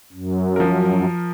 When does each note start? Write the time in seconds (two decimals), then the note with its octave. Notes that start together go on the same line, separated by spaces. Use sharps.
0.12 F#2
0.56 F3 A#4